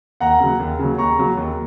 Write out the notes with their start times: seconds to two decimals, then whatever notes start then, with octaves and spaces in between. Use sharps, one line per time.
0.20 D#2 F#5 A#5
0.40 C#3 F#3
0.60 D#2
0.79 C#3 F#3
0.98 D#2 A#5 C#6
1.18 C#3 F#3
1.37 D#2